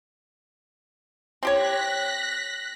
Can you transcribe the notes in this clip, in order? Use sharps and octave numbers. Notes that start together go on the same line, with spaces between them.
C4 G4 C#5 F#6 A#6 B6